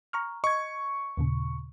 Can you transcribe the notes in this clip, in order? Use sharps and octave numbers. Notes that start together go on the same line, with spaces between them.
A#5 C#6 F6
D#5 C#6 G#6
D#2 A#2 C#3